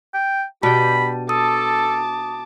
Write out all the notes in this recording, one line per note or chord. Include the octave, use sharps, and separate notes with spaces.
G5
B2 D4 G4 G5 A5 B5
A4 A5 D6 D#6